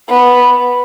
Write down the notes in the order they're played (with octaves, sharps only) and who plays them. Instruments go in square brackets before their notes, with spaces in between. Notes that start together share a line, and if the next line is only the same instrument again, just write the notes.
[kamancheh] B3